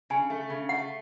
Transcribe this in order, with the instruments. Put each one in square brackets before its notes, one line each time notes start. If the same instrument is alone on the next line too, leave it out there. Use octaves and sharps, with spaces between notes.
[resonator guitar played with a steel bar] C#3 [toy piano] G#5
[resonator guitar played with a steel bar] A3
C#3
[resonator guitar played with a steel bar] A3 [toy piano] F#5